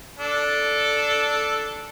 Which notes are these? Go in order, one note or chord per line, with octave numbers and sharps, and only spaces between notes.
D4 A4